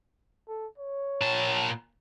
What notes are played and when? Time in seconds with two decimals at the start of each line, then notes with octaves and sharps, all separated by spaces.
0.48 A4
0.78 C#5
1.22 A#2 A5